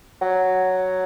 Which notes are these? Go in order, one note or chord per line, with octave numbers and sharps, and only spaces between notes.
F#3